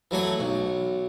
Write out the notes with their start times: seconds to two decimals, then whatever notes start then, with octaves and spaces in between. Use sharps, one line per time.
0.11 E3 F#3 A3 G#5
0.40 B1